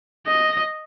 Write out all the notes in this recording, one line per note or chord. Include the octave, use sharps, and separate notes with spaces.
D#5